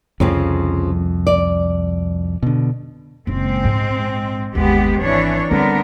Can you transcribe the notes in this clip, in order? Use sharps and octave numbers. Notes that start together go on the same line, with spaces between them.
C2 F2 C#3 F3 C4
D5
B2 D3
F#1 A#2 G#3 C4
A#1 G#2
G1 D#2 G#3 B3 G4
G#1 E3 D4 C#5
D3 G3 B3 C4 A#4